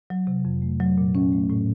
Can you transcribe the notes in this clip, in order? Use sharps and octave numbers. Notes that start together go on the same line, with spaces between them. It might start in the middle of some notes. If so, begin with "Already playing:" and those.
F#3
C3
F2
A3
F#3
A#2
C#4
A3
A2